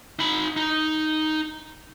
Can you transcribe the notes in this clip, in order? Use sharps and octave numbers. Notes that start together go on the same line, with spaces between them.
D#4 B5
D#4